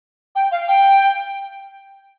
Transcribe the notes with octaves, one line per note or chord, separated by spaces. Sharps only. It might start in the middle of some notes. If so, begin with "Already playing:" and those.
G5
F5
G5